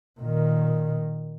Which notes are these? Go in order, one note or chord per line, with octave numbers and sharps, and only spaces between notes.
A#2 D#3